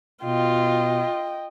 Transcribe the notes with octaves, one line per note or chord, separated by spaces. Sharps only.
B2 F4 D#5 G5